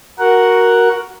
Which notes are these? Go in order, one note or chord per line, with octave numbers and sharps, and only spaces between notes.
F#4 A#4 F#5